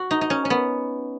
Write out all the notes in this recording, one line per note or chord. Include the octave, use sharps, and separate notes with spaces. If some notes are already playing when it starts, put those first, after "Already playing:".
Already playing: F#4
D#4
D#4
C#4
C#4
B3